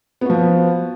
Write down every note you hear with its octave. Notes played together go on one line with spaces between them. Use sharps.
F3 B3 F#4